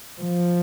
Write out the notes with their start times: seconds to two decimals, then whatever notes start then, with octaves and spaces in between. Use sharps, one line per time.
0.22 F3